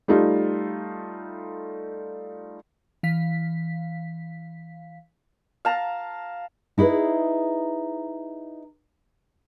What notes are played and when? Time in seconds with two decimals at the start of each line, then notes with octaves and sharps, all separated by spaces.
0.08 G3 A3 D#4 F4
3.03 E3 F5 B6
5.65 F5 A5 A#5
6.78 D#4 E4 G#4 B4